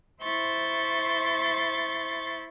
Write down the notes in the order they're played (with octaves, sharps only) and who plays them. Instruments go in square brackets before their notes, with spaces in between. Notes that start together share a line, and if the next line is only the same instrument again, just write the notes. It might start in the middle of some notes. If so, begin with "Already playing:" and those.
[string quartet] E4 C5 C6 C#6 A6